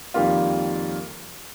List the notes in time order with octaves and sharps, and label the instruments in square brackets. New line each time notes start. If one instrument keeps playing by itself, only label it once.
[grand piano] F2 D#3 G3 A#3 F4